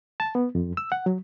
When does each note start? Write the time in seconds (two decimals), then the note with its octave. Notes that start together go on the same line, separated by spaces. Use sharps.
0.20 A5
0.35 B3
0.55 F2
0.77 E6
0.92 F#5
1.06 F#3